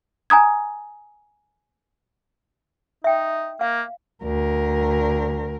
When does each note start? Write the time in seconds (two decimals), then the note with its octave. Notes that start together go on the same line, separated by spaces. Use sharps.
0.30 G#5 A#5 D#6 G#6
3.04 D#4 E5 G5
3.61 A#3 F5
4.24 D2 A#4